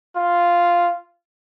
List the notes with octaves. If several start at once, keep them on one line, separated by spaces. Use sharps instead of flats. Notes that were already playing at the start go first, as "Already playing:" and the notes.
F4